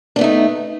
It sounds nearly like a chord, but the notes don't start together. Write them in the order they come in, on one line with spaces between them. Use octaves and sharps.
D4 B3 A3 D#4